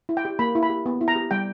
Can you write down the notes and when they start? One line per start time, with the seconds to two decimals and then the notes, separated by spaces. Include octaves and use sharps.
0.09 E4
0.17 G5
0.25 G4
0.39 A#3 B5
0.55 E4
0.63 B5
0.70 G4
0.86 B3
1.01 E4
1.08 A#5
1.16 G4
1.31 G3 G5